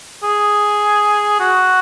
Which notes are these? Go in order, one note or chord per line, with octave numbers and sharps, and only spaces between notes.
G#4
F#4